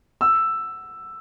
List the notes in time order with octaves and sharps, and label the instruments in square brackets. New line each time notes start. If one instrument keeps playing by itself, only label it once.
[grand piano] E6